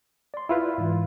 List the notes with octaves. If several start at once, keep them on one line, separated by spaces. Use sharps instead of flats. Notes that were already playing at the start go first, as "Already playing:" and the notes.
D5 C6
E4 F4 B4
G#2 E3